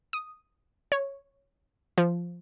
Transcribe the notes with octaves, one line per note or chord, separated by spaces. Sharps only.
D#6
C#5
F3